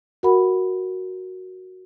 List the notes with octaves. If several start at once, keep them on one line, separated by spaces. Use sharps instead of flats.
F#4 A#4 F#5 B5